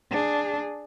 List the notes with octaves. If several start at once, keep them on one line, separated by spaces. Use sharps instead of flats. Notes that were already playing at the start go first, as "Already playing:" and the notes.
D4 G#4